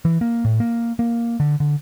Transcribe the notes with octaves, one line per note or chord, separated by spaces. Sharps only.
E3
A#3
A2
A#3
A#3
D3
D3